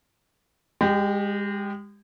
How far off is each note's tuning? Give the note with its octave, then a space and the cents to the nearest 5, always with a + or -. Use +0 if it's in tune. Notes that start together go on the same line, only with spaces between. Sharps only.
G#3 -30 G4 +0